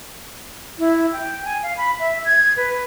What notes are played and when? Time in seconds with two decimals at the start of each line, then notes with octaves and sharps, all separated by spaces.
0.79 E4
1.12 G5
1.45 G#5
1.63 F5
1.77 B5
1.99 E5
2.25 G#6
2.57 B4